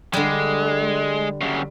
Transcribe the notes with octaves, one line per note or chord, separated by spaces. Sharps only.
D3 G3 G#3
F#2 C#3